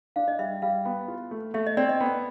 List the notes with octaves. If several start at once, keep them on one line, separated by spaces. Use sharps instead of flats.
D4 F5
D#5
G3 E5
G3 F5
B3
F4
A3
A3 E5
D#5
C4 D5
D#5
B3